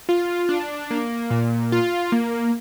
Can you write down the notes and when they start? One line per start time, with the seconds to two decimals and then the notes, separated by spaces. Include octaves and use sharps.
0.09 F4
0.49 D4
0.91 A#3
1.30 A#2
1.72 F4
2.12 A#3